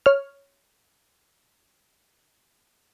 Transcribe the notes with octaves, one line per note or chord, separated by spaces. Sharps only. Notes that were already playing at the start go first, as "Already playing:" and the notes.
C#5 F6